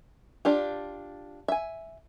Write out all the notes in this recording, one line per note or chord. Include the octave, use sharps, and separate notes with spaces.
D4 F4 G4
E5 G#5